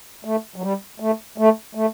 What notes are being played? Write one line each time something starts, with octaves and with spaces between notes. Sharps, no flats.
A3
F#3
G3
A3
A3
A3